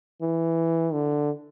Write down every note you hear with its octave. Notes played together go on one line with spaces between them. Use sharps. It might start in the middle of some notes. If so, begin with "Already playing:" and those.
E3
D3